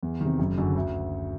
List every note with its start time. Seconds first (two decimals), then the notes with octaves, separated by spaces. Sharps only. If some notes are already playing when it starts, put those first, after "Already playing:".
0.03 E2
0.21 C3 D#3
0.39 F#1
0.58 F#2 D3
0.75 D2